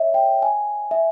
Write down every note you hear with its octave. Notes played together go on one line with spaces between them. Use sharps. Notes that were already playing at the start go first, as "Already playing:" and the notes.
Already playing: C#5 D#5 E5
G5
G#5
E5